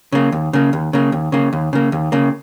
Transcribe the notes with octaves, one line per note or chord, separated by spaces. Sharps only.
C#3 A#3
D#2
C#3 A#3
D#2
C#3 A#3
D#2
C#3 A#3
D#2
C#3 A#3
D#2
C#3 A#3